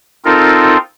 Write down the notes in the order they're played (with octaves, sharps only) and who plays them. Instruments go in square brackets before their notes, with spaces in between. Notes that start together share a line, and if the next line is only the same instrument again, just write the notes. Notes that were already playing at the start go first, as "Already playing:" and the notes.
[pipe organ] C4 D#4 F4 A4 A#4